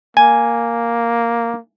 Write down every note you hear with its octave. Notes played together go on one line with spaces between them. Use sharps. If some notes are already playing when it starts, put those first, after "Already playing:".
A#3 G#5